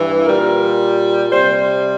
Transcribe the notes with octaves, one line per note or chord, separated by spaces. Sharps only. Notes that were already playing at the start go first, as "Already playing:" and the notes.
Already playing: G2 E3
A#2 G3 A#4
C3 G3 C5